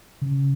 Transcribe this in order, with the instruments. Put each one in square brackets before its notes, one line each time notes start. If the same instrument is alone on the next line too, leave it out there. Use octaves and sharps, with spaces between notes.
[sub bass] C#3